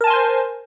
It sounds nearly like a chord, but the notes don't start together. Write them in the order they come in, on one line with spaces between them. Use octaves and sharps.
A#4 A5 G#5 C6 C5